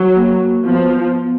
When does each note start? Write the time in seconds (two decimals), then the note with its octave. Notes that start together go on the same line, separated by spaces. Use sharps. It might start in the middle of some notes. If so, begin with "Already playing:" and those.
Already playing: F#3
0.16 A#3
0.65 F3 B3